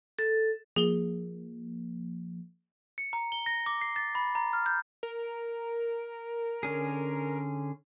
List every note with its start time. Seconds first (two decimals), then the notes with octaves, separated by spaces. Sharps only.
0.19 A4
0.76 F3 A#3 G#4 G7
2.98 C#7
3.13 A#5
3.32 G7
3.46 A#6
3.66 D6
3.81 C7
3.96 A6
4.15 B5
4.35 A#5
4.53 F6
4.66 G6
5.03 A#4
6.63 D3 C#4 G#4